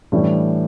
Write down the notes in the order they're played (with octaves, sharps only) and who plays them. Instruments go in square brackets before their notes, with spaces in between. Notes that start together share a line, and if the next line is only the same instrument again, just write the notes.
[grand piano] A2 E3 G3 D4